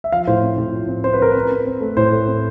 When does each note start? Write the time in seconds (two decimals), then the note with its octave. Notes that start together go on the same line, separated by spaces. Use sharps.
0.04 E5
0.12 F3 F5
0.27 A2 C5
0.43 C4
0.58 A2
0.74 F3
0.88 C4
1.04 C4 C5
1.13 B4
1.19 C4 A#4
1.31 C4 B4
1.51 C4
1.66 C4
1.81 A3
1.97 A2 C5
2.12 A3
2.28 C4